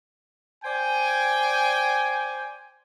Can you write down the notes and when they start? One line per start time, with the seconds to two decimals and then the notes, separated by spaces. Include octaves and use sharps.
0.65 C5 D5 G5 G#5